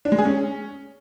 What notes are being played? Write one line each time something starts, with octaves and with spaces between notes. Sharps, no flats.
D4
G#3
G#4
C#4